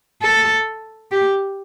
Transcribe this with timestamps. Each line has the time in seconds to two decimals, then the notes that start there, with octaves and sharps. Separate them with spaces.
0.23 A4
1.12 G4